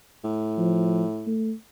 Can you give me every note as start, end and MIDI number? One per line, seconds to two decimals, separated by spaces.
0.24 1.35 45
0.58 1.04 53
1.27 1.53 57